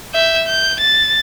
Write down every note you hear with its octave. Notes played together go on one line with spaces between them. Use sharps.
E5 G6
G6
A6